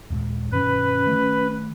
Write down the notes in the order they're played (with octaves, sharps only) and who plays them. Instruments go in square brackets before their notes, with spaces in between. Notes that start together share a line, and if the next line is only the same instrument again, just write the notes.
[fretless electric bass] D#2 A#2 G#3
[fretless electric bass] G2 B2 D#3 [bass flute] C#4 [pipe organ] B4
[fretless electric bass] D#3 F#3 A3